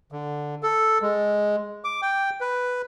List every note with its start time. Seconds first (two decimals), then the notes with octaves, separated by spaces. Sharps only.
0.12 D3
0.63 A4
1.02 G#3
1.84 D6
2.02 G5
2.41 B4